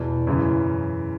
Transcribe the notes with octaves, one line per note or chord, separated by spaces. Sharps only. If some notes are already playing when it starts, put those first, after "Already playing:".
Already playing: E2 B2
F#2 C#3 E3